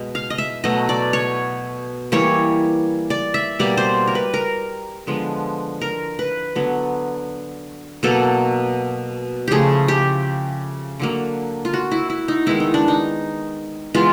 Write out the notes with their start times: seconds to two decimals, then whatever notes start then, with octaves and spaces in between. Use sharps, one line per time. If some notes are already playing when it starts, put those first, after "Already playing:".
Already playing: B2 G#3 D#5
0.15 F5
0.30 D#5
0.38 E5
0.64 B2 F#3 A3 D#5
0.89 D5
1.13 C#5
2.12 E3 G3 A#3 C#5
3.10 D5
3.34 E5
3.59 B2 G3 A#3 D5
3.77 C5
4.07 A#4
4.15 B4
4.34 A#4
5.07 D3 F3 G#3 B3
5.81 A#4
6.19 B4
6.55 D3 F#3 B3
8.03 B2 F#3 A#3 A4
9.48 C#3 F3 A3 G4 G#4
9.88 G4
11.00 D3 F#3 A#3
11.65 F4
11.73 F#4
11.91 E4
12.10 E4
12.28 D#4
12.46 D#3 G#3 B3 E4
12.60 D#4
12.74 D4
12.88 D#4
13.94 E3 G#3 B3 F4